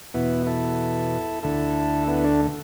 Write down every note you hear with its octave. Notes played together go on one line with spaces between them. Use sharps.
E2 B2 B3 E4
E4 A4
D2 D3 E4 A4
B3 E4
A3 D4